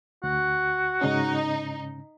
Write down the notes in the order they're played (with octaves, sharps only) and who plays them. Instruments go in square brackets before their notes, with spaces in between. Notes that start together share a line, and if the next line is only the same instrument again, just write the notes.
[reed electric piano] D2 [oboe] F#4
[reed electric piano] G#2 C#3 C#4 [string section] D#4